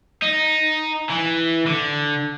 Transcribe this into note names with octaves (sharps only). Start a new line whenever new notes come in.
D#4
E3
D3